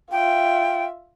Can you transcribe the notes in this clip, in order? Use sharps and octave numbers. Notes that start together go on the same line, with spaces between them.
F4 E5 G5